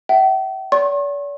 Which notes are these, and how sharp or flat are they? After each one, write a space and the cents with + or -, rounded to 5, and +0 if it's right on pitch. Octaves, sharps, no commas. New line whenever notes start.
E5 +0 G5 -45
D5 -45 C#6 -45